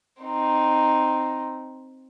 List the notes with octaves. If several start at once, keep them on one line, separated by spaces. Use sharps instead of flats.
C4 D#4